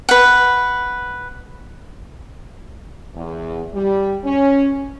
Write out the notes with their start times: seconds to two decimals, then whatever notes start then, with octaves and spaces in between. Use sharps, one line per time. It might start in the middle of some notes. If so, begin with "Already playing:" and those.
0.09 B4 F#5
3.14 E2
3.72 G3
4.24 C#4